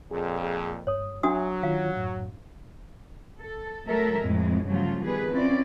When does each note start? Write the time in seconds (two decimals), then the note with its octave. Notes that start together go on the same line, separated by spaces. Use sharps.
0.11 F2 A#2 G#4
0.43 G#4
0.87 G2 C#5 D#6
1.23 F#3 D4 F#4 E5 G#5 D#6
1.63 D#3 F4 C#5 F5
1.96 F#2 A2
3.42 A4
3.87 F#3 A3 A4 A#4 E5
4.19 F2 A2 G#3
4.68 G2 C#3 F3 F#3 A3 F4
5.03 D#3 F3 G3 B3 G#4 B4
5.32 C4 C#4 E4 F4 D5